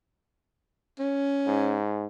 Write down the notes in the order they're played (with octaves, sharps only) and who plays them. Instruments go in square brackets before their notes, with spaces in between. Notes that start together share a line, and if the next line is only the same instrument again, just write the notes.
[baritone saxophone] C#4
[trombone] G#2